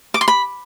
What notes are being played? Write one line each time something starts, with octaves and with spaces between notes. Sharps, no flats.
D6
C6
B5